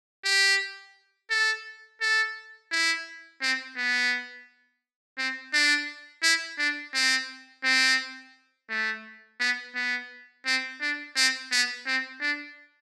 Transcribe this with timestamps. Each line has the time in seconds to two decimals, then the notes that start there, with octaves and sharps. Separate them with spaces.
0.25 G4
1.31 A4
2.01 A4
2.72 E4
3.42 C4
3.77 B3
5.18 C4
5.53 D4
6.23 E4
6.58 D4
6.94 C4
7.64 C4
8.70 A3
9.40 B3
9.75 B3
10.46 C4
10.81 D4
11.17 C4
11.52 B3
11.86 C4
12.21 D4